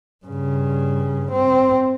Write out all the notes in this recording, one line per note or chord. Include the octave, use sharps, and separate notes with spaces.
G2 C#3
C4